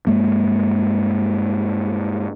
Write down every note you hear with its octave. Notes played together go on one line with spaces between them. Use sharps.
G2 G#3 A#3